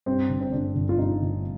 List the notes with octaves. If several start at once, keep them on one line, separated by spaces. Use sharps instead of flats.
G2 C4
G1
C4
G1 D4
G1
F4
G2 D#4
G1